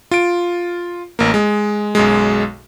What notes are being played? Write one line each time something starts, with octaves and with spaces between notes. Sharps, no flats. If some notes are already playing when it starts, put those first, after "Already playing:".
F4 D7
A1 A#3
G#3
B1 F#2 G#3